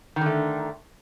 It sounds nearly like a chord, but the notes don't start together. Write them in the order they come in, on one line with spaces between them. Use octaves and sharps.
D#3 D3 A3